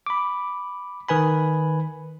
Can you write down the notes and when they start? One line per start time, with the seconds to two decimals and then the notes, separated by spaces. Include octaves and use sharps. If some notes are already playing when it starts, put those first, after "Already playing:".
0.06 B5 D6
1.09 D#3 B4 G#5 B5